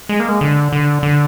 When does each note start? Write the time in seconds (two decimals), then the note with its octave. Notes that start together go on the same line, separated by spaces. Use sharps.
0.09 G#3
0.20 A#3
0.29 G#3
0.41 D3
0.73 D3
1.03 D3